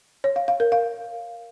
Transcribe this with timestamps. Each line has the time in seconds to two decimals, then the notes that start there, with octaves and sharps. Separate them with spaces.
0.24 C#5
0.36 F5
0.48 F5
0.60 A#4
0.72 F5